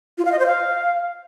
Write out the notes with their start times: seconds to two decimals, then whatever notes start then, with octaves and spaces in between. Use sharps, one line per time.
0.18 F4
0.25 F5
0.32 D#5
0.39 C5
0.46 F5